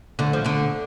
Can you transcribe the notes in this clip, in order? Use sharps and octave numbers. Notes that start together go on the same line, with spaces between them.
D2 D3
F3
D2 D3